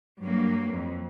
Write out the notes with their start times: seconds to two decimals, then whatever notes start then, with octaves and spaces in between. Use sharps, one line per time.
0.21 G2 F#3 A#3
0.72 F2